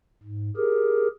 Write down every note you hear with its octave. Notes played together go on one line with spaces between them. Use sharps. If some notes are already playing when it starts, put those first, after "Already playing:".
G#2
G4 G#4 A#4